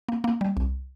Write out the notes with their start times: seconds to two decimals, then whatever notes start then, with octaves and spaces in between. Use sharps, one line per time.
0.09 A#3
0.24 A#3
0.41 G3
0.57 C2